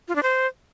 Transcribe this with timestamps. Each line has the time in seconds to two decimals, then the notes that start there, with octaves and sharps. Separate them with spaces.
0.08 F4
0.15 D4
0.23 C5